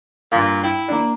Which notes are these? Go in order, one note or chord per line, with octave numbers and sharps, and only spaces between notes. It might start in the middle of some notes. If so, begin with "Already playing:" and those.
G2 A#2 F5
E4 G5
A#3 D4